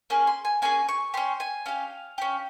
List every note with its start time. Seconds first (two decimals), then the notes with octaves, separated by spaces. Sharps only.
0.10 A#3 C#4 G#4
0.27 C6
0.45 G#5
0.62 A#3 C#4 G#4 G#5
0.89 C#6
1.14 C#4 G4 C6
1.40 G#5
1.66 C#4 G4 F5
2.18 C#4 G4